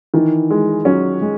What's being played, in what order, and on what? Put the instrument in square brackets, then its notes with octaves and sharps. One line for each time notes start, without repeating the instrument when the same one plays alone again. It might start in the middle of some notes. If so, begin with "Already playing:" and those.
[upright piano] D#3 [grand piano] E3
[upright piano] G#3
[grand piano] F#3 [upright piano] C#4
[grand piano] G#3